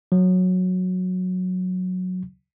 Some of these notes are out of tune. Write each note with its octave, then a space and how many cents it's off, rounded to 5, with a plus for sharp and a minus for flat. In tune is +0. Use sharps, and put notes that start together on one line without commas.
F#3 -15